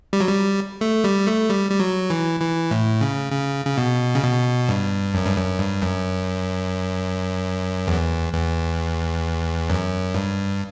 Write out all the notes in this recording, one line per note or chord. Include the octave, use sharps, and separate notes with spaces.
G3
F#3
G3
A3
G3
A3
G3
G3
F#3
E3
E3
A2
C#3
C#3
C#3
B2
C#3
B2
G2
F#2
G2
F#2
G2
F#2
E2
E2
F#2
G2